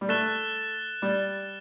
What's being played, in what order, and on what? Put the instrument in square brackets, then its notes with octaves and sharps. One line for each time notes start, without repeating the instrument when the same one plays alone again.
[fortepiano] G3
[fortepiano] A3 [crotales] F#6 A6 E7 G7
[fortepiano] G3